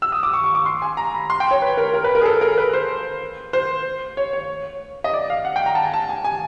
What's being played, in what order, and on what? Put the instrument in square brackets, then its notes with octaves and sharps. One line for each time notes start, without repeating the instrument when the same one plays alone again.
[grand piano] E6
D#6
D6
C#6
C#6
D6
C6
G#5
A#5
B5
C6
G5
C#5
B4
A#4
A#4
B4
A#4
G#4
A4
A#4
B4
C5
C5
C#5
C#5
D#5
D5
F5
F#5
G5
A#5
A5
G#5
A5
G#5
G#5